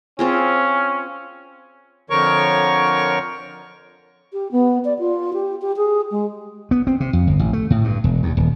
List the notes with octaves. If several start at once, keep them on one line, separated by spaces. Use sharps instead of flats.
C4 C#4 F4 G#4
F2 D3 F3 A#4 C#5 C#6
G4
B3
D5
F4
G4
G4
G#4
G#3
B3
C4
C3
F2
G1
A1
A3
A2
G2
E1
D#2
D#1